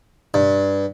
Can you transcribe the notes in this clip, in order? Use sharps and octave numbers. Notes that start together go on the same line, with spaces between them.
G2